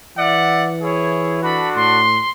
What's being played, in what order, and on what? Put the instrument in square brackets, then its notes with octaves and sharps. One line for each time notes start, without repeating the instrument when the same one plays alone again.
[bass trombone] E3 [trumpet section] D5 E5 F#5
[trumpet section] E4 G#4 C#5
[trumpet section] D4 F#4 A4 [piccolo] B5
[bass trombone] A2 [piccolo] C6